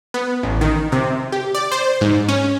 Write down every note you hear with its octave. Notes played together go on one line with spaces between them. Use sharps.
B3
A1
D#3
C3
G4
D5
C5
G#2
C#4